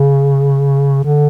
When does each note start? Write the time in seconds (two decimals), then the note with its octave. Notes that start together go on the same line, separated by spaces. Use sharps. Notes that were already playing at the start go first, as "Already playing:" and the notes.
Already playing: C#3
1.04 D3